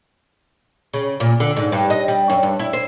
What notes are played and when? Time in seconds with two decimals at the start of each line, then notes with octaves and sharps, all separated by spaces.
0.94 C#3
1.20 A#2
1.40 D3
1.57 G#2
1.72 G2
1.90 D#5
2.08 G3
2.30 F#2
2.43 G2
2.59 E4
2.73 C5